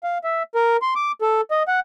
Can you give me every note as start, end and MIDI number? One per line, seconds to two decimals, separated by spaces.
0.04 0.18 77
0.24 0.43 76
0.55 0.77 70
0.82 0.94 84
0.96 1.12 86
1.22 1.41 69
1.51 1.63 75
1.68 1.80 78